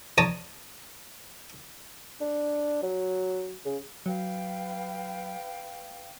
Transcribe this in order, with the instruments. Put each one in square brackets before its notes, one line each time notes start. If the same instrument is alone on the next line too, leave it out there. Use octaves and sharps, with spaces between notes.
[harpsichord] C#5 D5 A5 A#5 D#6
[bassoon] D4
F#3
C#3
[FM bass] F#3 [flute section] B4 F5 G5